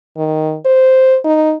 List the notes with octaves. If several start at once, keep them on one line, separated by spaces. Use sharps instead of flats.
D#3
C5
D#4